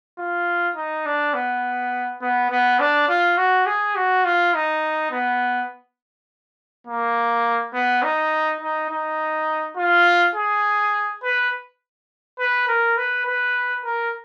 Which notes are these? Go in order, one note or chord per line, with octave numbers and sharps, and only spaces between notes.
F4
D#4
D4
B3
B3
B3
D4
F4
F#4
G#4
F#4
F4
D#4
B3
A#3
B3
D#4
D#4
D#4
F4
G#4
B4
B4
A#4
B4
B4
A#4